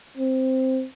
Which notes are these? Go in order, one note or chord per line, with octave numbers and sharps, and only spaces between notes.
C4